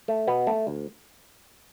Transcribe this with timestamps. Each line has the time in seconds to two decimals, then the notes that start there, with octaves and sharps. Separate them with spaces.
0.08 A3
0.27 B2 B3
0.47 A3
0.67 D2